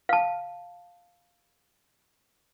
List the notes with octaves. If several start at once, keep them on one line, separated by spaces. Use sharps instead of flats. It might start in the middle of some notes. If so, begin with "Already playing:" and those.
F5 A5